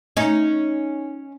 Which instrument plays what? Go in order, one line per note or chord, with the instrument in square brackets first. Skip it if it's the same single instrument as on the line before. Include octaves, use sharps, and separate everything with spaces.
[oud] C#4 D#4